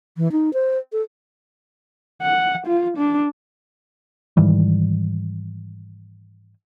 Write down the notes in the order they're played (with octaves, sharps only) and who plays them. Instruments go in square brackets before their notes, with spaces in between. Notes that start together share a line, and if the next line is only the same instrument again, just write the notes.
[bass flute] E3
D#4
C5
A4
[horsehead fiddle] F#5
F4
D4
[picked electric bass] G#2 D#3 E3 G3